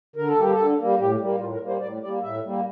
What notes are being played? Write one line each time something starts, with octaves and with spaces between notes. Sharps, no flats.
D3 A#4
A4
G3 A#3 G4
A4
D3
G3 A#3
A2 G4
G3 A#3
A2 F4
A#4
G3 A#3
C5
A2 D5
G3 A#3 D5
A2 E5
G3 A#3